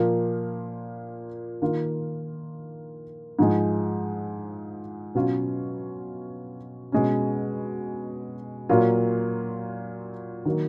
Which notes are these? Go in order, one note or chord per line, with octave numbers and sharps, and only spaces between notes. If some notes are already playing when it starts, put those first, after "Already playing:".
Already playing: A#2 F3 A#3 F4
D#3 A#3 F4
G#2 F3 G#3
B2 F#3 C#4 F4
B2 G#3 C#4
A#2 F#3 A#3 F4
D#3 F#3 A#3